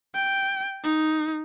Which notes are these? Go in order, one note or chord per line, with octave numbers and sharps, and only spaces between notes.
G5
D#4